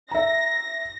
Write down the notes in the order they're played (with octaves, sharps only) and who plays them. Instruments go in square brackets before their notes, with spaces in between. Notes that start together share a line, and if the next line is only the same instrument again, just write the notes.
[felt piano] E5 A#5 [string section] A#6